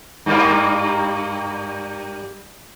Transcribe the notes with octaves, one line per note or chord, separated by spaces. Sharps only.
G2 G3 A#3